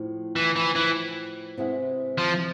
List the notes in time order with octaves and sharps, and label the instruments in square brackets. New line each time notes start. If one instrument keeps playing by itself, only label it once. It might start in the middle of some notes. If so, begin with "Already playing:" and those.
Already playing: [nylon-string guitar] A2 F3
[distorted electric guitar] E3
E3
E3
[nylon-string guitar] C3 G#3 B3 E4 G#4
[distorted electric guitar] F3